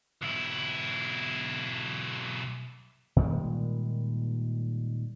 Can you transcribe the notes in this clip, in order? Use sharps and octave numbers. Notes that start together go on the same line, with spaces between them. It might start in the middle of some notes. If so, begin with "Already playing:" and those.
B1 E4
A#2 D#3 G3 G#3